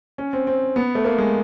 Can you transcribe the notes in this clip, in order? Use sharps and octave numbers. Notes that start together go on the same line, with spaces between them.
C#4
C4
C4
B3
A3
A#3
G#3